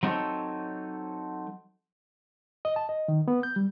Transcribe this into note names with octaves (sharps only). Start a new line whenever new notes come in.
F#3 C4 D#4 F4 A4 C#5
D#5
A5
D#5
D#3
B3
G6
G3